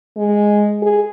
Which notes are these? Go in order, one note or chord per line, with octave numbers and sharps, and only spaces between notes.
G#3
G#4